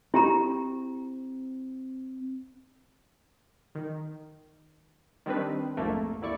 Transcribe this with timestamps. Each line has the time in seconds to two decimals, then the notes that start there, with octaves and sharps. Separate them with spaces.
0.14 C4 E4 G4 A#5
3.75 D#3
5.26 D#3 G3 C4 D4 B4
5.77 A#1 F2 G#2 A3 A#3
6.22 D#2 E4 D5 C#6